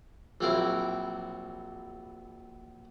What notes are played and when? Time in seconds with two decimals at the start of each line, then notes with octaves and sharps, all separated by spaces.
0.41 A#1 A#2 F#3 C4 E4 A#4